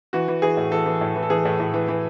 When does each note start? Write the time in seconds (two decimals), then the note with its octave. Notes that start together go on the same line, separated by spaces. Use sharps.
0.13 E3 F#4
0.28 E3
0.42 E3 G#4
0.57 A2
0.71 E3 A4
0.86 E3
1.01 A2
1.16 E3
1.22 A4
1.30 E3 G#4
1.45 A2
1.60 A2
1.74 E3
1.88 E3